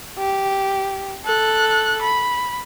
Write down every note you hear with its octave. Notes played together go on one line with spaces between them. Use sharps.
G4
A4 F#6
B5